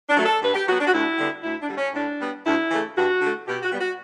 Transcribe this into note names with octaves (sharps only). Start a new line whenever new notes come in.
D4
F#3 A3
A4
G2 B4
G4
F#3 B3 F#4
D4
F#4
D2 E4
D3 G3 B3
D2 E4
D4
D3 G3
C#4
A2 D4
G3 B3
D2 E4
C#3 E3 A3
G2 F#4
D3 A3
B2 G4
F#4
G3 B3
F#4